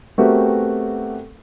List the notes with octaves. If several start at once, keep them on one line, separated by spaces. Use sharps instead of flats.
A3 B3 C4 F#4 G4 A#4